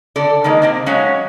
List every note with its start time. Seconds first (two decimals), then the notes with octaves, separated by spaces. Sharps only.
0.16 D3 A4 D5
0.44 D#3 G#3 A#3 D#4
0.62 C3 A#3 C4
0.86 F#3 G#3 C#4 F#4 C#5 F5